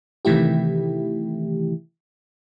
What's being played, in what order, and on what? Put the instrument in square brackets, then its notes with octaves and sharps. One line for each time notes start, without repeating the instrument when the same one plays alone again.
[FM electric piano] C3 D#3 E3 A3 E4 G4